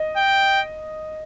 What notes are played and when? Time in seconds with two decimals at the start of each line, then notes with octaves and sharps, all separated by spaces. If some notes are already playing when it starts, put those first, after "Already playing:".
Already playing: D#5
0.17 G5